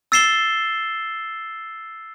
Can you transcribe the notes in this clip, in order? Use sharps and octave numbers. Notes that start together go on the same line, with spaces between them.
E6 A6 C7 E7 G7